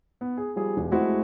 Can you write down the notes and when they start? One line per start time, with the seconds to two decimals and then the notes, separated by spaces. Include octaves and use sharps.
0.21 B3
0.37 G#4
0.56 F3 G3 G#4
0.77 E1
0.92 G#3 A3 C4 E4 F#4